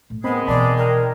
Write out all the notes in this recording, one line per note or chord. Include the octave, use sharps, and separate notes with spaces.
A2
D#3 G#3 B3 C4 G#4 B5
B2 E3 D5 A5 B5
A#4 G5 F6